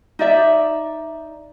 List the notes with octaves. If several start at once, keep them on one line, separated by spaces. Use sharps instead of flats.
D#4 D5 E5